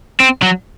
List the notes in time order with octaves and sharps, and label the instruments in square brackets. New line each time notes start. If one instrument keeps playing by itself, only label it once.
[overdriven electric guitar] C4
F#3